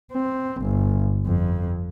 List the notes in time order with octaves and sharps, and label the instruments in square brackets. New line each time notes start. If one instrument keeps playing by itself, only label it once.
[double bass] C4
G1
F2